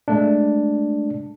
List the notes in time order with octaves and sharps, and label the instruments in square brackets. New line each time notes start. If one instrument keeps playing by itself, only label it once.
[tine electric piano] G#3 A3 D4